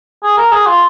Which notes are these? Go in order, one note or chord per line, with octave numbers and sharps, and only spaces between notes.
G#4
A#4
G#4
F4